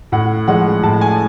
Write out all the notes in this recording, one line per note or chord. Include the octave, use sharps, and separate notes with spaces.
A2 F#5
F3 G#3 F#5
A2 A5
G#5